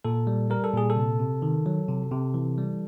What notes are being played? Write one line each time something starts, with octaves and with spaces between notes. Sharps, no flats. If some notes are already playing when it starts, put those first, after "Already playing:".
A#2 A4
G3
G3 A#4
A4
A#2 G#4
A4
C3
C3
D#3
F#3
C3
C3
E3
G3